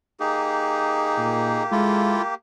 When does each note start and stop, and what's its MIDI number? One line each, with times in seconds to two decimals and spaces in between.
0.20 2.35 58
0.20 1.63 63
0.20 2.35 67
0.20 1.63 68
1.17 1.62 46
1.72 2.18 56
1.72 2.22 64
1.72 2.22 65
1.72 2.22 69